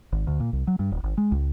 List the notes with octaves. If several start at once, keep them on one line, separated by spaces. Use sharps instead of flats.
G#1
D2
A#2
C2
F#3
G2
D#1
G#1
G#3
C#2